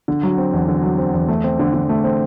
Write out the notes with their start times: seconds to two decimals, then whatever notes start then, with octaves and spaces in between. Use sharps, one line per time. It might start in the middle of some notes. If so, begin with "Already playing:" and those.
0.08 D3
0.23 F#3
0.38 C4
0.53 E2
0.68 D3
0.83 F#3
0.98 C4
1.14 E2
1.28 A3
1.44 C4
1.59 D3
1.74 D3
1.89 A3
2.04 C4